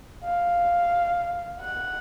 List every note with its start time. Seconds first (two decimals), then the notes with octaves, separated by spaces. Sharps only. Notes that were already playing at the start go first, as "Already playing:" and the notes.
0.24 F5
1.59 F#5